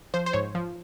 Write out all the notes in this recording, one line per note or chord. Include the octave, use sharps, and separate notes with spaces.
F3 C5
C5
G#2 C#5
F3